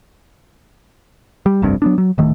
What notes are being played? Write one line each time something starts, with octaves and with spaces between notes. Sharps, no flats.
G3
F1 C2 G2 C3
F#3 B3 D4
F#3
D1 D#3 A3